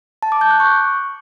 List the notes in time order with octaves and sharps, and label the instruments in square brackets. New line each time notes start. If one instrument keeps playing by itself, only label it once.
[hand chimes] A5
D6
G6
F#6
C#6